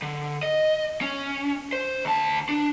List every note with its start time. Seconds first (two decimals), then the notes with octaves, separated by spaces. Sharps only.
0.02 D3
0.43 D#5
1.01 C#4
1.73 C5
2.05 D2 A5
2.49 D4